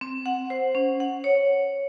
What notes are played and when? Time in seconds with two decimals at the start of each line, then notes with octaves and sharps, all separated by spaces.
0.01 C4
0.26 F#5
0.50 C5
0.75 C#4
1.00 F#5
1.24 C#5